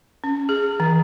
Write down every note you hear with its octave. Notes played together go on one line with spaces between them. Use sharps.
C#4
G#4
E3